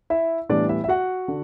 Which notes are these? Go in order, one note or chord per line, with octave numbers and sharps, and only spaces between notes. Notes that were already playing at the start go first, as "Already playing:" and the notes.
E4 E5
A2 E3 G3 B3 D4 D5
E4 E5
E5
F#4 F#5
D3